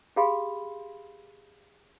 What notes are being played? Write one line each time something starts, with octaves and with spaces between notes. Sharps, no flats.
G4 G#4 F5 B5 C6